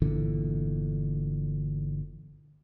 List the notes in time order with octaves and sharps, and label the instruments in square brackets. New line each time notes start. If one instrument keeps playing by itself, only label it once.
[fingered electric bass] G1 A#2 D3 E3